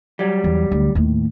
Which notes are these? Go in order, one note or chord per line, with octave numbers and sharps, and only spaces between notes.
F#3 G3
E2
D2
D#2 A2